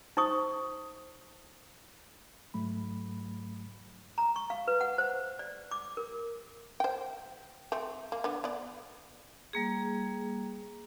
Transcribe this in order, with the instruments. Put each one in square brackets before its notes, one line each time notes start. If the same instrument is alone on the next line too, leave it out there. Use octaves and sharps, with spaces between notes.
[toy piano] D#4 C5 C#6 D#6
[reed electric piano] G#2 F#3 A3 B5
[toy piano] A#5
C#6
F5
B4
F#5
C5
D5
D6
A#4
[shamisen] C5 G5
A3 C4
A#3
D3 B3
B3 D5
[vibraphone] G3 A#3 G#4